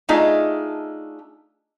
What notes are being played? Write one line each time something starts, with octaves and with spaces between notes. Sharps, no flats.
A3 D4 D#4 F4 G#4 D#5